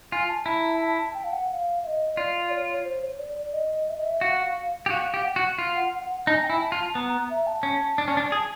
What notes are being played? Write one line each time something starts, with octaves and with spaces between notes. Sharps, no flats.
F4 G#5
A5
E4 A#5
A5
A5
A5
G5
F5
F#5
F#5
F5
E5
D#5
F4 D5
C#5
C5
C#5
D5
D5
D#5
E5
D#5
E5
F#4 F5
G4
F#4 F5
G4
F#5
F#4
F4
D#4 A5
G#5
G5
E4 G#5
A5
F4
B3 A#5
A#5
E5
A5
C#4
D4
C#4
D4
G#4